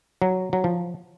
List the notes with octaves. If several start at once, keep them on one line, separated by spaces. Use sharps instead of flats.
F#3
F#3
F3